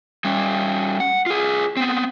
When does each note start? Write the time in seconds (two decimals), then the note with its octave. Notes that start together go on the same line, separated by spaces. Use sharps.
0.24 G3 C#4
1.00 F#5
1.26 F4 G#4
1.77 B3 C4